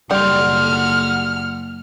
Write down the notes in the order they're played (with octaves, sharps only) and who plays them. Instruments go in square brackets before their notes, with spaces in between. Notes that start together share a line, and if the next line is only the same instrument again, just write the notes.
[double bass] F#1 [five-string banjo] G3 [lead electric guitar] F#5 C6 [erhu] F6